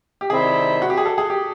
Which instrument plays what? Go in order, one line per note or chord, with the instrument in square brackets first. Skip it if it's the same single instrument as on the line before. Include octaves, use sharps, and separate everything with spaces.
[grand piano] G4
[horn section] C3 D#3 G3 C4 E4 [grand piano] G#4
[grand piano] F#4
G4
G#4
A4
G#4
G4